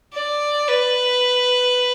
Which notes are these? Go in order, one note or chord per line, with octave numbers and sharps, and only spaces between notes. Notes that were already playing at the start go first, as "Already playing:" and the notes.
D5
B4